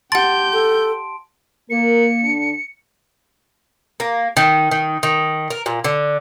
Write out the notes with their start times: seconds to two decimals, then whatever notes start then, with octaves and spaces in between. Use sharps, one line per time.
0.12 G4 F#5 A5 C6 G6 A6 D7
0.53 A4
1.70 A#3 A#4 C#7
2.23 D3 D4
4.00 A#3
4.37 D#3
4.71 D#3
5.03 D#3
5.50 A#4
5.66 A#2
5.84 D3